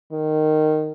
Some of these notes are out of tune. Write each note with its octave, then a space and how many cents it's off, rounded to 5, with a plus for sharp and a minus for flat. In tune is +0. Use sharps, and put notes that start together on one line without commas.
D#3 -10